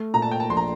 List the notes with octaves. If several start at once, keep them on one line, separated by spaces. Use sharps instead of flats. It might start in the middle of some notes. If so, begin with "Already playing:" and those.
Already playing: A3
A#2 A#5
A5
G5
A5
A#1 C6
A#5